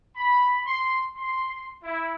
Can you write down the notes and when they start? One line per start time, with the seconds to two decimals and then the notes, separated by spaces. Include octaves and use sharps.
0.16 B5
0.66 C6
1.15 C6
1.83 E4